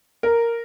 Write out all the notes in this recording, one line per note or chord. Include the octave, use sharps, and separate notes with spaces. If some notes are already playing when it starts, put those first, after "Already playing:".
A#4